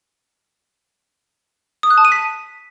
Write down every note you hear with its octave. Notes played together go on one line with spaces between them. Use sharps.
D#6
F#6
A5
D#7
B6